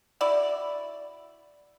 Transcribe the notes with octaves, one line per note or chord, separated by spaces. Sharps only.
E4 F#4 D5